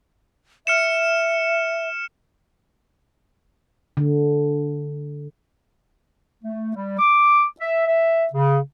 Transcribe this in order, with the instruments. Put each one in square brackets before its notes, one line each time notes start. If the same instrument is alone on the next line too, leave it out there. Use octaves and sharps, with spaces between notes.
[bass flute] E5 [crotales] F6 C#7 E7
[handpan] D3
[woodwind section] A3
G3
D6
E5
E5
C#3